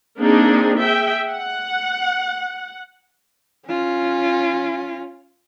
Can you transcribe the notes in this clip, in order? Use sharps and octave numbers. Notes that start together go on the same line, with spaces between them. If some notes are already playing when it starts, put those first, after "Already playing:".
A#3 C4 D4 D#4 G#4
G#4 E5 G5
F#5
C#4 F4